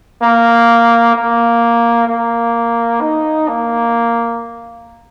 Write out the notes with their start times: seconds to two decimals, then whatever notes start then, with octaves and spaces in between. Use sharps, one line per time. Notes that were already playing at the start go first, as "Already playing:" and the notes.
0.22 A#3
1.16 A#3
2.08 A#3
3.01 D#4
3.48 A#3